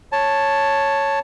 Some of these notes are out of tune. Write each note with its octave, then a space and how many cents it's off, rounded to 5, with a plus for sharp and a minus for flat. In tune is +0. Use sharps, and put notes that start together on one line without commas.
C#5 +0 A5 +0